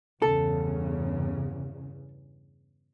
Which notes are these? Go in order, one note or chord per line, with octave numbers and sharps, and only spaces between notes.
E2 G2 C#3 A4